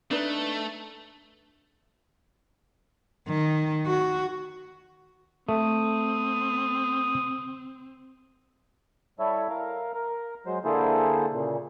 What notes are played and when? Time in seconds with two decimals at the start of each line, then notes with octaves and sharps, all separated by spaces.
0.11 A3 D4 D#4 B4
3.28 D#3
3.87 F#4
5.49 A3 C4 D#6
9.19 G3 E4 A4 C#5 E5
9.50 A#4 F5
9.94 A#4
10.46 F#3 G#3 C5
10.65 D3 A#3 E4 G#4 A4 C5
11.33 A#2 C#3